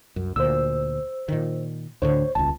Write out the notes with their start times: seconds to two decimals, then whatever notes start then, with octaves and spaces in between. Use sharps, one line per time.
0.16 C2 F#2
0.36 D2 A#2 C5 E6
1.28 A#2 D#3
2.02 D2 A2 D3 C5 C#5
2.35 D#1 C#2 A5